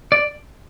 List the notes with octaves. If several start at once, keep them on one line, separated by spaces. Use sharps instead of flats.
D5